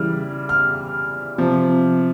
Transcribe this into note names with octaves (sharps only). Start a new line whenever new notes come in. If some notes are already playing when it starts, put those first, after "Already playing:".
Already playing: C#3 E3 G3 F6
F6
C3 F3